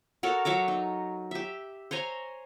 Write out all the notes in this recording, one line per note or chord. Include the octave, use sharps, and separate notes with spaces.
F#4 A4 A#4 C#5
F#3 C#5 E5 D6
D#4
G4 E5
C5 C#5 G#5 A#5